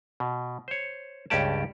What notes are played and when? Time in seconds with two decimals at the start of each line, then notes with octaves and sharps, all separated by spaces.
0.20 B2
0.68 C5 C#5
1.30 C#2 G2 C#4 G4 D5 A5